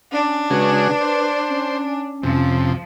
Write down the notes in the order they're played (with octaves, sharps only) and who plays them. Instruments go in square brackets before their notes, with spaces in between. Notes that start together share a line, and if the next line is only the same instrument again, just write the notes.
[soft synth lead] C#4 [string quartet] D4
[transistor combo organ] C#3 G#3 F#4 [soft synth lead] B4
[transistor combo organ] C5
[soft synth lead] C#4
C#4
[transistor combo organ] F2 C3 [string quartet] F3